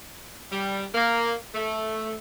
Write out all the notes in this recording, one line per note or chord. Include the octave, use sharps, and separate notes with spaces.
G3
A#3
A3